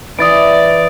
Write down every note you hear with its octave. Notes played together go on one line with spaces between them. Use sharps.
E3 D5 D#6 A6 D7